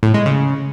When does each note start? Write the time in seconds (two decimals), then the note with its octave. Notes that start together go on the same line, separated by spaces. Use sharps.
0.03 A2
0.14 G#3
0.26 C#3